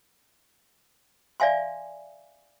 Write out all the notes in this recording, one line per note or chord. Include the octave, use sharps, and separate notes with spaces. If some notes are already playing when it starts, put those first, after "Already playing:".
D5 E5 F5 G#5 C6